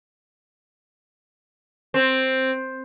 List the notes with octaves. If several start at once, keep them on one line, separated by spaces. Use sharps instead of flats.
C4